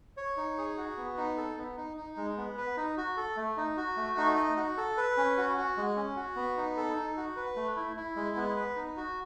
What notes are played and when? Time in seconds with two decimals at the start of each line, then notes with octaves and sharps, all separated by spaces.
0.17 C#5
0.37 D#4
0.58 G#4
0.78 F#4
0.97 B3
1.17 D#4
1.37 A4
1.57 B3
1.77 D#4
1.97 D#4
2.17 G#3
2.37 B3
2.57 B4
2.77 D#4
2.97 F#4
3.17 A4
3.37 A3
3.57 D#4
3.77 F#4
3.97 A3
4.18 D#4
4.36 D#5
4.57 F#4
4.77 A4
4.97 B4
5.17 C#4
5.37 F#4
5.57 F#4
5.77 G#3
5.96 C#4
6.16 F#4
6.36 B3
6.57 D#4
6.77 A4
6.96 D#4
7.17 F#4
7.37 B4
7.56 A3
7.77 E4
7.97 E4
8.16 G#3
8.36 B3
8.56 B4
8.76 D#4
8.97 F#4